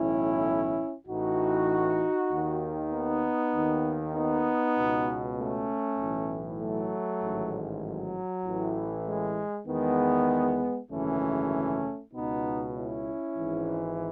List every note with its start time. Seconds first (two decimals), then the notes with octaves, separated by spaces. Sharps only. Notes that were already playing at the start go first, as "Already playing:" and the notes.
Already playing: B1 A2 E3 C#4 E4
1.07 A1 A2 E3 D#4 F#4
2.30 D#2 D#3
2.91 B3 D#4
3.54 D#2 D#3
4.15 B3 D#4
4.77 C#2 B2
5.37 A3 C#4
5.98 B1 A2 E3
6.61 F#3 A3
7.22 A1 G#2 D#3
7.84 F#3
8.45 A1 A2 E3
9.07 G#3
9.67 E2 D#3 G#3 B3
10.90 G#1 F#2 C#3 E3 A3 C#4
12.13 C#2 B2 B3 D#4
12.75 C#4 E4
13.36 G#1 G#2 E3